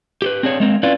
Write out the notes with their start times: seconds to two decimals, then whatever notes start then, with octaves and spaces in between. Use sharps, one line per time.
0.22 G4 A4 B4
0.43 C4 D4 G#4 C#5
0.60 G#3 A#3 C4
0.83 C#4 E4 F4 B4 D5